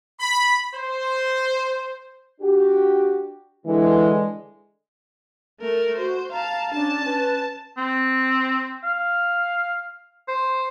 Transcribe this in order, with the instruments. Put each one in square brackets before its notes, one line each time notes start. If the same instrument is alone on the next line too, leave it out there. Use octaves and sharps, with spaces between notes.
[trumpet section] B5
C5
[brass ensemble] D4 F#4 G4
[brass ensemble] D3 G#3 [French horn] E3
[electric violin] A3 A#4
[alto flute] F#4 [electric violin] C5
[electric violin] F5 A5 [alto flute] A#5
[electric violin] C#4 A5 [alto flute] D4
[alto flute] B4
[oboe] C4
F5
C5